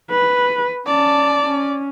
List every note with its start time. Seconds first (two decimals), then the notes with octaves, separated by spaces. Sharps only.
0.10 B4
0.87 C#4 D5 A5
1.46 C#4